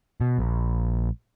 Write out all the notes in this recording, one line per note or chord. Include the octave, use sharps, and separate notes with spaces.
B2
A#1